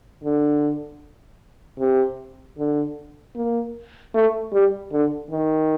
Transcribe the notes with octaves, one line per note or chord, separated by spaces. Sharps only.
D3
C3
D3
A#3
A3
G3
D3
D#3